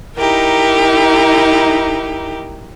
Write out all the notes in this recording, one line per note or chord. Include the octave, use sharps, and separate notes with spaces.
D#4 E4 G4 A#4